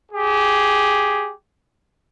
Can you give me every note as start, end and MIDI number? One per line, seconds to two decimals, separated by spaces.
0.11 1.32 67
0.11 1.32 68